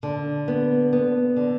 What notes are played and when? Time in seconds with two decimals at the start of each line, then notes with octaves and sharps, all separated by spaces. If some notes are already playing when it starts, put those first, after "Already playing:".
0.03 D3
0.48 B3
0.93 B3
1.37 D3